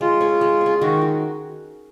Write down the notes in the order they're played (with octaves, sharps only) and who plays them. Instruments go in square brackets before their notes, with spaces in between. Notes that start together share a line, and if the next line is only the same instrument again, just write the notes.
[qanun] G#3 [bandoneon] F4
[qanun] C#4 G#4
G#3
C#4 G#4
[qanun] D#3 [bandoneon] F#4
[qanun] F#4